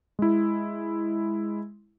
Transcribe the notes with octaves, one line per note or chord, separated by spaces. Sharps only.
G#3 E4